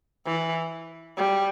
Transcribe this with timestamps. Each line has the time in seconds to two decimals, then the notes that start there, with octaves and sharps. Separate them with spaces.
0.26 E3
1.17 G3